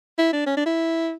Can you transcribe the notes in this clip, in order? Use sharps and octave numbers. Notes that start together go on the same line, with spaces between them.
E4
D4
C#4
D4
E4